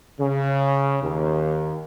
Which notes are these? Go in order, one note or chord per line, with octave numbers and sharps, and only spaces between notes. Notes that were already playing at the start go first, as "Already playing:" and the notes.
C#3
D#2